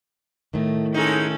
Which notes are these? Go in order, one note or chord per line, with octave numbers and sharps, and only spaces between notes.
A2 D#3 A3
G#3 C#4 D#4 A4